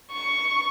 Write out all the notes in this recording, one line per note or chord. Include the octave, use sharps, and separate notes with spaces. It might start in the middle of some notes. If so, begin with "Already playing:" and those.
C#6